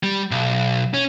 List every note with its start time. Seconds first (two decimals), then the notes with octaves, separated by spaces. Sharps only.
0.03 G3
0.31 B1
0.94 C#4